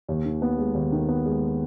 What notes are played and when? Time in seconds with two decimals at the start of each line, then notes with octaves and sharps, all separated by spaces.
0.09 D#2
0.25 D#3
0.42 B3
0.58 G#3
0.74 D#2
0.92 D#3
1.09 B3
1.26 G#3